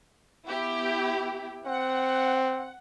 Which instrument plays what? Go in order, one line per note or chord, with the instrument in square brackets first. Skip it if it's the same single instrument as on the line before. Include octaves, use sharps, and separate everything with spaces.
[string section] B3 E4 G4
[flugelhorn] C4 [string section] F#5